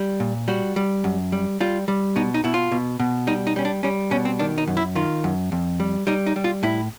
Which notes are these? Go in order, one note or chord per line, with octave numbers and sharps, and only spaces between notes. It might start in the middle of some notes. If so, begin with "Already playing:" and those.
Already playing: G3
A#2
G3 F#4
G3
F#2
G3
G3 F4
G3
B2 D#4
D#4
B2 E4
F4
B2
B2
G3 D#4
D#4
G3 C#4
D4
G3 C#4
B2 C#4
C4
D#3 D4
D#4
F#2
E4
D#3 F4
F#2
F2
G3
G3 D#4
D#4
G3
F4
A2 E4